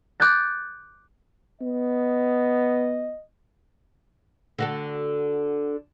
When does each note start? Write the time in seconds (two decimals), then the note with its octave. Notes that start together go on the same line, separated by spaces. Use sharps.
0.20 D6 F#6 G6 A6
1.61 B3 D#5
4.59 D3 F#4 A4